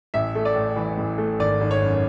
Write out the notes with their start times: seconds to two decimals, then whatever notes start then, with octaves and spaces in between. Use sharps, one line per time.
0.14 A1 E5
0.35 A3
0.45 D5
0.55 A2
0.76 E3
0.98 A1
1.18 A3
1.39 G#1 D5
1.61 G#1
1.71 C#5
1.81 F#2